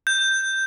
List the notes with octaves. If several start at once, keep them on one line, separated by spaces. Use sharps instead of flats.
G6